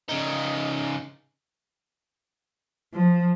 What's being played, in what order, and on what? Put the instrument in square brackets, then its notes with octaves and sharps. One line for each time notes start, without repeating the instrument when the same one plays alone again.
[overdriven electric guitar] C#3 D#4
[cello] F3